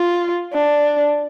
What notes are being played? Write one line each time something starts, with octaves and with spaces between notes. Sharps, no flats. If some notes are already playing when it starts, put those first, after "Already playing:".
Already playing: F4
D4